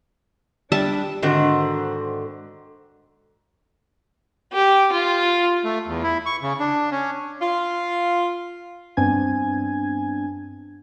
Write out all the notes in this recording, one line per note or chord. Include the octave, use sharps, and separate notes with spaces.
G3 D4 E5 A5
G#2 D3 D#3 C4 F#4
G4
F4
A3
E2
E4
C#6
C#3
D4
C#4
F4
G2 B3 C4 D4 G#5 G#6